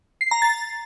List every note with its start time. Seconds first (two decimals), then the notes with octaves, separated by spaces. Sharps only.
0.21 C7
0.31 A#5
0.42 A6